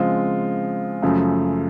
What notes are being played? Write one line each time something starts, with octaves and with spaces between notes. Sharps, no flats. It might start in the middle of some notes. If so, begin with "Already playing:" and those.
Already playing: C#3 F3 G#3 C4 F4
F#2 C#3 F3 A3